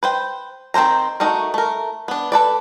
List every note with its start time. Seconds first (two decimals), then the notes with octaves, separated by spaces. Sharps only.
0.03 B4 C5 G5
0.74 D#3 C4 A#4 C5 A#5
1.20 A3 D#4 F#4 A#4
1.54 A3 A#4
2.08 B3 D4
2.32 A4 B4 D5